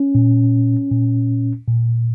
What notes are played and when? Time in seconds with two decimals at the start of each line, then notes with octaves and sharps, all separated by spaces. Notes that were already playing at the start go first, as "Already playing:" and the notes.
Already playing: C#4
0.15 A#2
0.91 A#2
1.67 A#2